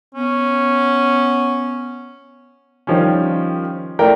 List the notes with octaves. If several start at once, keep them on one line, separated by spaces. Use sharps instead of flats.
B3 C#4
D#3 F3 G3 C#4
A3 E4 A#4 D5 G5